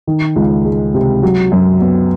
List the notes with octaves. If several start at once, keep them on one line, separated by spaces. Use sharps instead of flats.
D#3
C#2
G#3
C3
F#3
F#2
B3